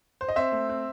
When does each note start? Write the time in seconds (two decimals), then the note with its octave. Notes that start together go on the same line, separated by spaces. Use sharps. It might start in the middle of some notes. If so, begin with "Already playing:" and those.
0.21 C5
0.29 D#5
0.36 C4 C5 E5
0.52 A3
0.69 C4